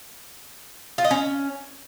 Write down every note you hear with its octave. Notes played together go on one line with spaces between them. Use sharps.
F4
D#5
C#4